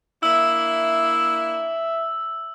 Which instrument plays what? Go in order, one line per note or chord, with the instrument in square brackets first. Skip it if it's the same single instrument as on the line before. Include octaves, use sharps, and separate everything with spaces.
[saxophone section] A#3 D4 E4 [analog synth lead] E5 [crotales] E6